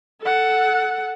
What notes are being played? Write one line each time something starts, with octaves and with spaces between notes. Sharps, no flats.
A4 F#5